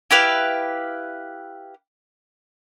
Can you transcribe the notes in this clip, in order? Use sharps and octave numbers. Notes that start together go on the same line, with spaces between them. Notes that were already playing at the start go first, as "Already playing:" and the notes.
E4 G4 B4 F5